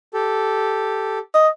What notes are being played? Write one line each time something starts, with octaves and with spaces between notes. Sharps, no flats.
G4 A4
D#5